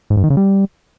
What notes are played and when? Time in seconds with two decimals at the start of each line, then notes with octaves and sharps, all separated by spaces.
0.10 G#2
0.17 G2
0.24 D#3
0.30 C#3
0.37 G3